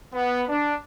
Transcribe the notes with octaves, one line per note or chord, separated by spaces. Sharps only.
B3
D4